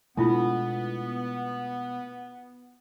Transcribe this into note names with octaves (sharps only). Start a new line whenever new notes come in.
B2 G#3 A3 B3 D4 E4 F4